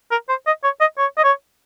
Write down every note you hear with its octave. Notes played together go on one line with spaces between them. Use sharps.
A#4
C5
D#5
C#5
D#5
C#5
D#5
C#5